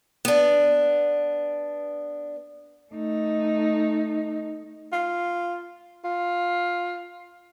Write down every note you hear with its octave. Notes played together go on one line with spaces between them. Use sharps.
B3 D4
A3 D#4
F4
F4